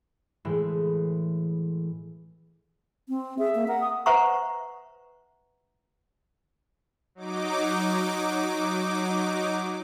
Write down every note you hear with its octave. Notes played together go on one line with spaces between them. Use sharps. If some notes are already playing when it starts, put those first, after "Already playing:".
A2 E3 G#3 A3
C4
G#4 E5
A#3
A#4 F#5
D#6
B4 C5 E5 F#5 A#5 C#6
F#3 D#4 D6